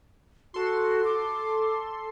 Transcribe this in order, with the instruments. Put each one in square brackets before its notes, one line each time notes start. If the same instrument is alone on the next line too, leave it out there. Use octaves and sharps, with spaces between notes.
[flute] F#4 [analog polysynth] A4 C6
[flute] D6